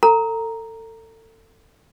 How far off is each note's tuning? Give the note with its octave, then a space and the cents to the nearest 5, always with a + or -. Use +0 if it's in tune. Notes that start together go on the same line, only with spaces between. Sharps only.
A4 +30 A#5 +0